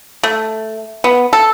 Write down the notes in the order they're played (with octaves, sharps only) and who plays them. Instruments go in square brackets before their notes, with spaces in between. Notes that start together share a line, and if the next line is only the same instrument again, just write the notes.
[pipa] A3
B3
A4